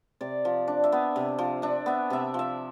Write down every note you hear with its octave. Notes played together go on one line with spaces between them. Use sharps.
C3 D5
F3
D4
E5
B3
C3
F3
D4 E5
B3 E5
C3 E5
F3 E5